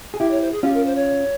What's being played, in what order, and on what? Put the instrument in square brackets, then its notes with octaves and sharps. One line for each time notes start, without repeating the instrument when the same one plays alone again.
[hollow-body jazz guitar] G#4
[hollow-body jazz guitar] E4 G4 [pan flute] E5
[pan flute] C#5
C5
G#4
[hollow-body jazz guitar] C#4 F4 [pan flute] G4
[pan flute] A#4
C5
C#5